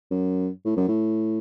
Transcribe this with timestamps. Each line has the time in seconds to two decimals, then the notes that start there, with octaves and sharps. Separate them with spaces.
0.11 F#2
0.65 A2
0.77 F#2
0.88 A2